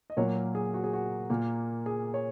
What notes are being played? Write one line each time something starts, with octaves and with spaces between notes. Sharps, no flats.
D#5
A#2 F#3 A#3 C#5
A#4
G#4
F#4
G#4
F#4
A#2 A#3
G#4
C#5